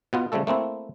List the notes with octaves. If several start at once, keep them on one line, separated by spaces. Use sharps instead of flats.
B2 B3 F4
C#3 F3 G3 A3 A4
A3 A#3 C4 E4